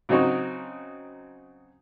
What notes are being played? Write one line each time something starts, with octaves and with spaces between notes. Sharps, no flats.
C#3 F#3 C4 D#4 F#4